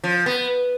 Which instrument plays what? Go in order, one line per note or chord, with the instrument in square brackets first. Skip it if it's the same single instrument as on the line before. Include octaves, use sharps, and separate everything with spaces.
[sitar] F3
B3